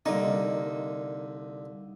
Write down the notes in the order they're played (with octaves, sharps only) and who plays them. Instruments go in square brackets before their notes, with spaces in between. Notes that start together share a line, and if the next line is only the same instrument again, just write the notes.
[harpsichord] C2 D3 D5 [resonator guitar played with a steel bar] A#3 D#4